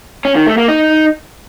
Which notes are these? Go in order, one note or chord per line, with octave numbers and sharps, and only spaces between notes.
C#4
D#3
A3
A#3
D#4